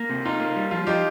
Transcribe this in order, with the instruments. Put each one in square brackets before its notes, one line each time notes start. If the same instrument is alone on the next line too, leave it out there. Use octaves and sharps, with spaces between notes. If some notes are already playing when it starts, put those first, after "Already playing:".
Already playing: [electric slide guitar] A#3
C3
[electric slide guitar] D#4 [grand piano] F4
[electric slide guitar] A#3
G3
[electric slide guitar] F3 [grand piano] F4
[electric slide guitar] F3 [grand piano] D#4 G4